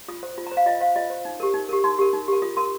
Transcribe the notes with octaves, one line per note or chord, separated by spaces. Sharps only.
F4 D#6
C5
F4
C5 A#5
F5
F4 D#5
C5 F5
F4 D#5
C5
D#4
G4 A#4
D#4
G4 A#4
D#4 C6
G4 A#4
D#4
G4 A#4
F4 D#6
A#4 C6